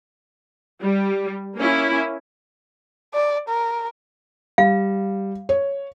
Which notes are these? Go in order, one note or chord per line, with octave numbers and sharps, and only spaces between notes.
G3
A#3 C#4 E4
D5
A#4
G3 F5
C#5